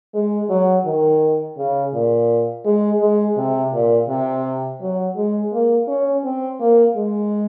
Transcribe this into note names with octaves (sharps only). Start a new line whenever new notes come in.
G#3
F#3
D#3
C#3
A#2
G#3
G#3
C3
A#2
C3
F#3
G#3
A#3
C#4
C4
A#3
G#3